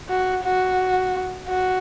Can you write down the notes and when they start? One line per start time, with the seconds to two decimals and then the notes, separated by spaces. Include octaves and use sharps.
0.09 F#4
0.44 F#4
1.47 F#4